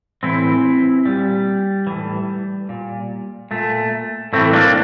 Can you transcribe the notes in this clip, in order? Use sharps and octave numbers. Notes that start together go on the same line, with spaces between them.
A2 E3 C4 E4
A#2 G3
A2 E3
A#2
A#2 A3
A2 E3 A3 C4
A#3 D4